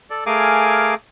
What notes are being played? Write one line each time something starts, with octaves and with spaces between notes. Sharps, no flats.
A4 D5
A3 G#4 A#4 F5 G#5 D6